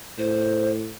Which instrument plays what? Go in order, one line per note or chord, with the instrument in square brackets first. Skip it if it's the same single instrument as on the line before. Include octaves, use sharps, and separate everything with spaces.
[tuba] A2 [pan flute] C5